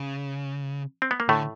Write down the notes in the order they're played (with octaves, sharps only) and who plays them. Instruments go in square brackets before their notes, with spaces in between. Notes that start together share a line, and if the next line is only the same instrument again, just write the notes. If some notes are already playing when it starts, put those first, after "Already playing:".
Already playing: [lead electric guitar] C#3
[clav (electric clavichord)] C4
B3
A#3
[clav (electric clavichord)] A2 A3 [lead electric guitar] D3